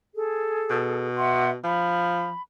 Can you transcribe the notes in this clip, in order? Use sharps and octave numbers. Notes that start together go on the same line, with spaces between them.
G#4 A4
B2
E5 F#5 C6
F3 B5